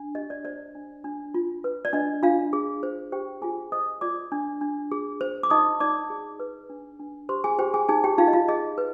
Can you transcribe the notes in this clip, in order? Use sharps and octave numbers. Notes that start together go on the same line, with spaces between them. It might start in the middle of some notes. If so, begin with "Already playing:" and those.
Already playing: D4
G4 D#5
D5
C5 D5
D4
D4
F4
B4
D5
D4 D#5
D4 F4 F5
G#4
C5
G4 C5 G5
F4 G#4 G#5
C5 D#5 D#6
F4 D5 D6
D4
D4
G#4
C5
D6
D#4 D#5 D#6
D#4 D5 D6
G#4
B4
D4
D4
G4 C5 C6
G#4 G#5
G4 C5 G5
G#4 G#5
D#4 G#4 G#5
G4 G5
D#4 F4 F5
D#5
F4 F5
G#4 D#5
B4